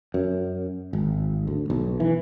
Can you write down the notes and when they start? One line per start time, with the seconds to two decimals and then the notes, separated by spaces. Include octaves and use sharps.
0.14 F#2
0.93 G#1
1.47 D2
1.70 B1
2.00 E3